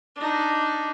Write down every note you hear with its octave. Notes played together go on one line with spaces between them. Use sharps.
D4 D#4